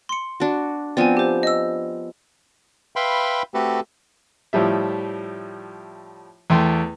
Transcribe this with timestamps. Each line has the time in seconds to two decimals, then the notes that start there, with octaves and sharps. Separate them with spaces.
0.09 C6 C#7
0.40 D4 F#4
0.97 F3 B3 C4 D5 G#5
1.17 G4 C5
1.43 D#5 E6
2.96 B4 E5 F5 G5 B5 C6
3.54 A3 C4 F#4 G4 A4 B4
4.53 A2 F3 G3 E5
6.50 E2 A3 G5 C6